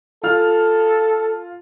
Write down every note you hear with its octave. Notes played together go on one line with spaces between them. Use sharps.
F4 A4 F6